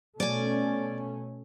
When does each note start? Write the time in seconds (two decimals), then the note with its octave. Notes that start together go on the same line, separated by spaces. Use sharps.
0.20 B2 A3 C#4 D5 G#5